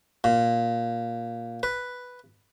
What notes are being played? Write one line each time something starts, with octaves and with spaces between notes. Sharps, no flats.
A#2
B4